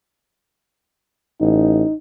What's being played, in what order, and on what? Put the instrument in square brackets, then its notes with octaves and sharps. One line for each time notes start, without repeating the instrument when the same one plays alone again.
[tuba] A1 [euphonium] D#4